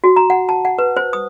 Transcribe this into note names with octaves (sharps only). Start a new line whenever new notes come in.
F#4
A#5
F#5
A5
F#5
B4
C5
D#6